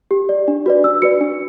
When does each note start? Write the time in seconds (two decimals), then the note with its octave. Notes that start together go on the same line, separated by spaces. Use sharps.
0.11 G4
0.29 D5
0.48 D4
0.66 F#4 B4 D5
0.84 D4 E6
1.02 F#4 B4 D5 C#7
1.21 D4